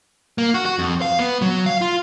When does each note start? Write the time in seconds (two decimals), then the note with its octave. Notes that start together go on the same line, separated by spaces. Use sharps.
0.38 A#3
0.54 F#4
0.66 F#4
0.79 F2
1.02 F5
1.19 B3
1.42 F#3
1.66 F5
1.81 F4